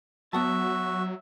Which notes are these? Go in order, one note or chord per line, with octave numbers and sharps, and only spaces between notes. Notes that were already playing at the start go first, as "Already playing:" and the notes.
F#3 B3 F#4 E5 F#5 A5